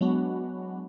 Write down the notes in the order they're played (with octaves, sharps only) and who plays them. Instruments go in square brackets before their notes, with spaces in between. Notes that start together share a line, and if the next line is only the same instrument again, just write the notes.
[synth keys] F#3 G#3 B3 D4 F#4